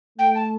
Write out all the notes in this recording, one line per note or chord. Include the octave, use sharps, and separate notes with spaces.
A3 G5
A5